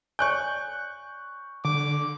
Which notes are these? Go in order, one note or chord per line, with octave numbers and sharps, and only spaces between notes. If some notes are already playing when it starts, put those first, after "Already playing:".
C#5 D5 G#5 C#6 F#6 G6
D3 D6